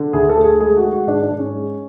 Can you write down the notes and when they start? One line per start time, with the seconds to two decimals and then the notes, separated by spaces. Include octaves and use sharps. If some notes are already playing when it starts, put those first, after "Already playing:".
Already playing: D3
0.13 D2 G#4
0.29 A4
0.37 A3
0.44 G#4
0.60 G#3 G#4
0.77 F#4
0.83 G#3
0.92 F#4
1.07 G#2 D4
1.22 D4
1.31 G#2
1.39 C#4
1.55 G#3